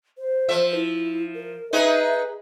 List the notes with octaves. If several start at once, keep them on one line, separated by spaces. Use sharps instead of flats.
C5
F3 E5
E4
A#4
D#4 G#4 B4 E5